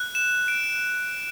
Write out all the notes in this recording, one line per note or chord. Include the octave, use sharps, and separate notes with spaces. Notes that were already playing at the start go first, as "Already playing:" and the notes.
Already playing: F#6
E7
D7